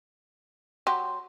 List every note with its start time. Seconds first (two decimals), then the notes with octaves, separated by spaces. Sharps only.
0.87 F#3 G4 C6